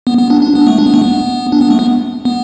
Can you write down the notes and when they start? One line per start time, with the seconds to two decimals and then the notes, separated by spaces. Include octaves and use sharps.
0.07 B3
0.18 B3
0.30 D4
0.42 D4
0.55 B3
0.67 A3
0.79 D4
0.86 B3
0.94 A3
1.02 B3
1.52 D4
1.61 B3
1.70 A3
1.79 B3
2.25 B3